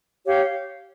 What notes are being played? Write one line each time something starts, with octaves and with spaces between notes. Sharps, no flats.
G4 C#5 F5